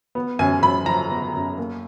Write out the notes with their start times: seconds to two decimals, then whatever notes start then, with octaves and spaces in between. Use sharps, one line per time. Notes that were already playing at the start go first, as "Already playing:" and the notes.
0.15 B3
0.39 F#2 G#5
0.62 F#2 B5
0.86 F3 A#5
1.10 B3
1.34 F#2
1.58 A#3